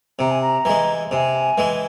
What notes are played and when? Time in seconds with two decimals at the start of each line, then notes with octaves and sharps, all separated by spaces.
0.19 C3 A#5
0.30 G#5
0.41 A#5
0.65 E3 G#3
1.11 C3 G#5
1.58 E3 G#3